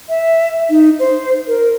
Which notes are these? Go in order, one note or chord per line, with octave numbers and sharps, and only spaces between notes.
E5
D#4
C5
A#4